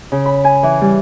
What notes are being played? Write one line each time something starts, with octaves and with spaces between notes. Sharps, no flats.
C#3
B5
G#5
E3
G3